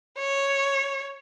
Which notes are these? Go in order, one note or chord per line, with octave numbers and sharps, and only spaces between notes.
C#5